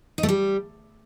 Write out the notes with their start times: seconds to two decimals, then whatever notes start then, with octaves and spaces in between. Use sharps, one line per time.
0.18 D#4
0.23 A3
0.29 G3